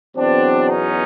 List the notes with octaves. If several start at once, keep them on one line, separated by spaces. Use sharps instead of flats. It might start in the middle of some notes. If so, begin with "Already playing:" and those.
E2 B2 F#3 C4 D4
C#4 D#4